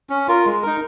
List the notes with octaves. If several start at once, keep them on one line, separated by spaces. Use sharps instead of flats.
C#4
F4 A#4
G#3
D#4 A#4